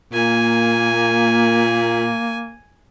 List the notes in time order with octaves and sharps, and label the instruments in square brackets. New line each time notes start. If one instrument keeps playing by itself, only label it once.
[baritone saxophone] A#2 [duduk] A#3 [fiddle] G#5